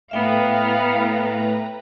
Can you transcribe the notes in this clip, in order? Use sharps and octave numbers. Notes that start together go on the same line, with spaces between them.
A2 B3 B4 E5 F5 G5 A#5